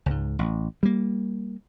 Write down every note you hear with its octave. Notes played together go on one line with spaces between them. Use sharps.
C#2 G#2
A1
G3 A#3